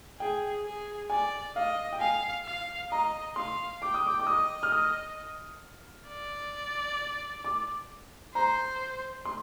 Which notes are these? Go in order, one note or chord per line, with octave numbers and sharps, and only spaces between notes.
G#4 G5
G#4
D5 G#5
D#5 F5
G5
F5 G#5
F5
D#5 A#5
F5 C6
G5 D6
D#6
D6
D6
D#5 D#6
F6
D#6
D5
D6
C5 A#5
C6